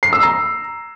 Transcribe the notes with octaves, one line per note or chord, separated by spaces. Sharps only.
C7
E6
A#5